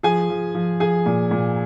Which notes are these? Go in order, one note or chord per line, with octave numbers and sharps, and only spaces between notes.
F3 G#4 G#5
F3
F3
F3 G#4 G#5
A#2
A#2